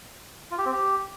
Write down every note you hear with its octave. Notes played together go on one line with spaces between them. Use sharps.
F4
G4
C4
G4